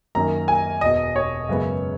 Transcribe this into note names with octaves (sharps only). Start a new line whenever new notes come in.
F#2 D#3 A#3 C#4 A#5
G#5
E1 E2 B2 D#5
C#5
F#2 C#3 G#3 B3